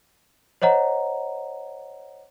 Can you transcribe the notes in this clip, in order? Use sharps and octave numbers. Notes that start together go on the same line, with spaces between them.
C5 C#5 D#5 F#5 A#5